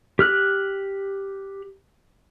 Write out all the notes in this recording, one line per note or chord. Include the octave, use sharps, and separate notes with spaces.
G4 F6 F#6